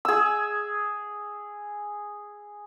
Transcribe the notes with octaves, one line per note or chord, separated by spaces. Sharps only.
G#4 E6